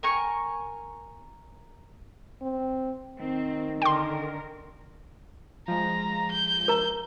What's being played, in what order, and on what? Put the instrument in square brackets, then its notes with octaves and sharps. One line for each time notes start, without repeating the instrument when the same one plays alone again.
[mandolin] A#4 G#5 C#6
[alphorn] C4
[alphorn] D#3 [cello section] C4
[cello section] D3 A#4 [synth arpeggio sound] G5 C6
[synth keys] F3 G#3 [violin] A#5
[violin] G6
[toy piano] A#4 A#5